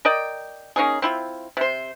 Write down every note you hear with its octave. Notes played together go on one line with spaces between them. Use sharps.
A#4 D5 D#5 G5
A#3 C#4 D#4 G#4
C4 E4 F4
C3 C5